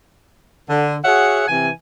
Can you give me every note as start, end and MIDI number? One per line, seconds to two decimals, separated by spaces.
0.69 0.96 50
1.04 1.43 66
1.04 1.43 68
1.04 1.43 73
1.04 1.43 76
1.04 1.43 78
1.48 1.69 48
1.48 1.69 52
1.48 1.69 80